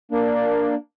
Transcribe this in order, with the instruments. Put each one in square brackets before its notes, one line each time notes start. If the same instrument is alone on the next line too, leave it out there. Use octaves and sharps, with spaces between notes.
[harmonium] A#3 D4